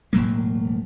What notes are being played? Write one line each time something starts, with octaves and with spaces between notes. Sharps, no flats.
E1 A2 F#3 A#3